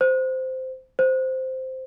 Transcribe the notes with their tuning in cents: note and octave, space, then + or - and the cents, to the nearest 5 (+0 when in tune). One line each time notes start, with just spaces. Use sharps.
C5 -10
C5 -5